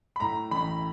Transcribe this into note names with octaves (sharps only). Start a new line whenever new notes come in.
B5
A2 A#5
A1 B5